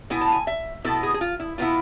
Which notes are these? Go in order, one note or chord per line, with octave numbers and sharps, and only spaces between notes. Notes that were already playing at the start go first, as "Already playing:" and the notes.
B2 B3 E4 G#5
A5
G#5
E5
B2 B3 E4 A4
G#4
G#4
F4
E4
B2 B3 E4 F4